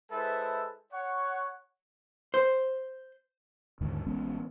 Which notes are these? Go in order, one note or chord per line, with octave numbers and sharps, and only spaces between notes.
G#3 E4 A4 B4 C5 E5
C#5 F#5 C#6
C5
D#2 G#2 D3 D#3
A1 G#3 B3 C#4